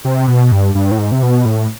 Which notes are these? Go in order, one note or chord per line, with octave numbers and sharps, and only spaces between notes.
C3
B2
G2
G2
A2
G#2
C3
B2
A2